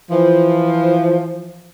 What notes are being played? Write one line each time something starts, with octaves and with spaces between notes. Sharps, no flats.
E3 F3